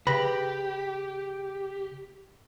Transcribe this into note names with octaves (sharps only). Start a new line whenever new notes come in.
C#3 G4 B4 B5 A#6